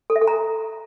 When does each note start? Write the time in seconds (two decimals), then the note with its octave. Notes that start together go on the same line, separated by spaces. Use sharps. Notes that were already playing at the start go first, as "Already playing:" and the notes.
0.10 A4
0.16 E5
0.22 A4
0.27 A#5